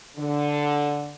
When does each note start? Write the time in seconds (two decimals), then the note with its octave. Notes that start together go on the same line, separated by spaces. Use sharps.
0.17 D3